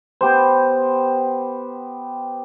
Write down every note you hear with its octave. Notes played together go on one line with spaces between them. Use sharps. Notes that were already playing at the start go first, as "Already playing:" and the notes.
B3 G4 C5